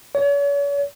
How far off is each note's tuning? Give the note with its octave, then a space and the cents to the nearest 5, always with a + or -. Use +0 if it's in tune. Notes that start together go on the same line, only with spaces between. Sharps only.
C#5 +40